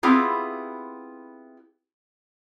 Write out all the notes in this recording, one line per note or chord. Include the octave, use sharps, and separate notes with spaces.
B3 C4 E4 F4 G4 G#4